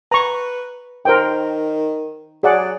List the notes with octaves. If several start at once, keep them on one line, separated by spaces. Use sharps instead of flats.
B4 A#5 C#6
D#3 A#4 C5 G5
F#3 G#4 D5 F#5